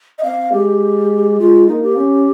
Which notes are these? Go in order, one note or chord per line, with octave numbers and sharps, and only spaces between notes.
D#5
C4 F5
G#3 G4
G#3 F4
A#3 D#4
G4
C#4